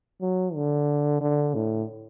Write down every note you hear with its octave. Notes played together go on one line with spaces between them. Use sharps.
F#3
D3
D3
A2